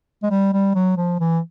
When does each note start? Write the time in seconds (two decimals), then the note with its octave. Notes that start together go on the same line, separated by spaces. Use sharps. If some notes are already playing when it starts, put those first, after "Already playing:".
0.23 G#3
0.30 G3
0.53 G3
0.75 F#3
0.97 F3
1.20 E3